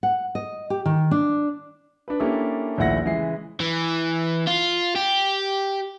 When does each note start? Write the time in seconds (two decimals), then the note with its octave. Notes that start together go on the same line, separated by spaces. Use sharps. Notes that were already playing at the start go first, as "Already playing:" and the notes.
0.03 F#5
0.35 D#5
0.70 G4
0.86 D#3
1.11 D4
2.08 D4 B4
2.20 A#3 C#4 D4 E4 G4 A4
2.78 A#1 D#2 A3 E4 F#5 A#6
3.05 C#3 E3 G#3 E5 C7
3.60 E3
4.47 F4
4.96 G4